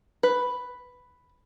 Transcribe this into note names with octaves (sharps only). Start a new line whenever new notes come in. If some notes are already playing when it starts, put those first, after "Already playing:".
B4